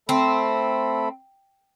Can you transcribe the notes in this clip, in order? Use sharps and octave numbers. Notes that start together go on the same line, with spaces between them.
A3 C4 A4 B5